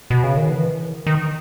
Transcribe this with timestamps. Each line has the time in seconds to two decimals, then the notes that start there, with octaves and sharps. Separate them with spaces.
0.10 B2
0.23 C#3
0.37 D#3
0.50 E3
1.07 D#3